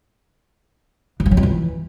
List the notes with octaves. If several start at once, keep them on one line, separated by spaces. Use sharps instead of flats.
E3
F3
F#3
F2
E3